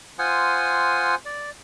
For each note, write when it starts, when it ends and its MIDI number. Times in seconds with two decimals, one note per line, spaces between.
0.19 1.15 65
0.19 1.15 72
0.19 1.15 78
0.19 1.15 80
0.19 1.15 87
1.25 1.50 74